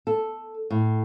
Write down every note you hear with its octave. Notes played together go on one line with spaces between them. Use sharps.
A4
A2